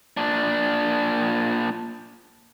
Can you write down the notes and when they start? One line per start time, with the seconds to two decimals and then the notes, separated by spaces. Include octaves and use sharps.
0.17 A#2 D4